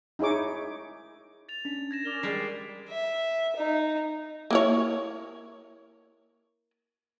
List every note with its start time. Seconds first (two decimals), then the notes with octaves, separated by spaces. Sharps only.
0.19 D#4 E4 G#4 C#5 D6
1.49 A6 F7
1.65 C#4 D4
1.91 G#6 A#6 E7
2.05 C#4 A#4 D5 D6 F7 G7
2.23 G3 G#3 G#4 B6 C7 D7
2.89 E5
3.56 D#4
4.50 A#3 E4 C#5